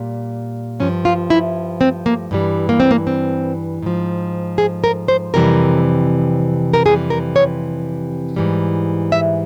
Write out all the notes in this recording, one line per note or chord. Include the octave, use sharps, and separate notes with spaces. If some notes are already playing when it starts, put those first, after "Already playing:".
Already playing: A#2 G3
G2 F3 C#4
F4
E4
C4
A#3
G2 E3 G3
A#3
C4
A#3
C4
G#2 F3
G#4
A#4
C5
F2 C3 E3 G3 A#4
A#4
F2 C3 E3 G3 G#4
A#4
C#5
G#2 E3 G3
E5